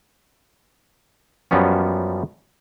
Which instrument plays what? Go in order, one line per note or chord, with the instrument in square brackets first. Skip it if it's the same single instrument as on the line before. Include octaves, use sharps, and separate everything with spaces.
[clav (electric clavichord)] F#2 F3 G3 B3 C#4